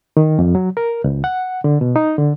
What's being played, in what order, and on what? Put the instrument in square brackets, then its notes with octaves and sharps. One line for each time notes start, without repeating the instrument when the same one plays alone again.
[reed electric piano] D#3
F2
F#3
A#4
C#2
F#5
D3
B2
D#4
D3